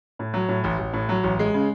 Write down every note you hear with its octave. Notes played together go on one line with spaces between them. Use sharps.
A2
F#3
A2
A1
A1
A2
F#3
A1
G#3
C#3